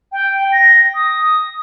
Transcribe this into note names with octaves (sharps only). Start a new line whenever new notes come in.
G5
A#6
D#6